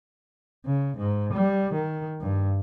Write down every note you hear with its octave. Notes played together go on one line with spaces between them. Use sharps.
C#3
G#2
G3
D#3
G2